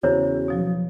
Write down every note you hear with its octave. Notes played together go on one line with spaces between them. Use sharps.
E2 C#3 E4 F#4 C5 C#5
B2 F3 F#3